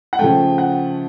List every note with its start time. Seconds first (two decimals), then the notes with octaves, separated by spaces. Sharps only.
0.13 F#5
0.19 C#3 F3 A3 G5
0.58 F#5